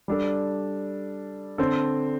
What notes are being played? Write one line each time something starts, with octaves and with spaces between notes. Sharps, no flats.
G3 D4 A4
D3 C4 A4